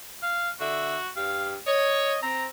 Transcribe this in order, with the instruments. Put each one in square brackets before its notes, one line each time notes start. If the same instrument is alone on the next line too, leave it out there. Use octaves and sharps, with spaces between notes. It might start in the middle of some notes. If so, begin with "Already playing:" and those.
[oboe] F5
[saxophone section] D3 E5 [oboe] F#4
[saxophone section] G2 G4 [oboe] F5
[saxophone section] C#5 [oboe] D#5
[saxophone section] C4 [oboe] A#5